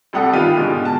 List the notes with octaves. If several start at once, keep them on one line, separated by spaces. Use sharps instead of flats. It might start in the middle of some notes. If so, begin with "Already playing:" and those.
D2 C3 G3 A4 F#5 D#6
D#3 B3 F4 G4 F6 D#7
G#2 B2 D3
A5